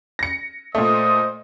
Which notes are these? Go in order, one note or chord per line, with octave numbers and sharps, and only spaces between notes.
A#6 C#7
A#2 A3 C5 D#5 D#6